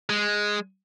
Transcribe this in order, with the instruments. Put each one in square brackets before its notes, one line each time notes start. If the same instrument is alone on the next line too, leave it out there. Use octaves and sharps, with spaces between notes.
[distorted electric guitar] G#3